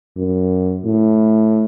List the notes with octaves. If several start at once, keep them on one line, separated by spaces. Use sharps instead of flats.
F#2
A2